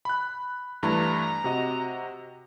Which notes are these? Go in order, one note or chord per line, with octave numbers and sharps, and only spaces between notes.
B5 F#6
G2 E3 A3 A#5
C3 F#4 D#5